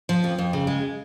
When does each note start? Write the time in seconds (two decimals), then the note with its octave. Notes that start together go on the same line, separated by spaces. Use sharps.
0.09 F3
0.24 F2
0.38 F2
0.53 C#3
0.67 G#3